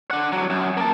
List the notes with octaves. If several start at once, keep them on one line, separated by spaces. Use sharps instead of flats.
D4 F#5
C2 F#3
F#2
A#3 A5